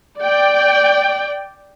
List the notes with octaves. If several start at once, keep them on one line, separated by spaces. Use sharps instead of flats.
D5 G5